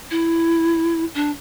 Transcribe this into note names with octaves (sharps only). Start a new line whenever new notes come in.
E4
D4